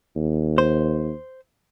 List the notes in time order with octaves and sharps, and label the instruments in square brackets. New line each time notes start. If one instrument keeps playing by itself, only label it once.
[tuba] D#2
[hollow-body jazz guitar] C5